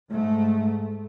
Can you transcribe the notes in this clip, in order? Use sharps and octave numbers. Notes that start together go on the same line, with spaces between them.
G#2 A3